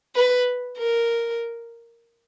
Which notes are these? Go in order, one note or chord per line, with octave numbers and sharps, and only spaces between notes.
B4
A#4